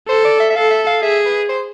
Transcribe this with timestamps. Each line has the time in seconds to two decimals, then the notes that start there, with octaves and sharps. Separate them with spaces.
0.08 A4 C5
0.25 D5
0.40 E5
0.50 E5
0.56 A4 F5
0.71 E5
0.87 F5
1.02 G#4 E5
1.26 B4
1.49 C5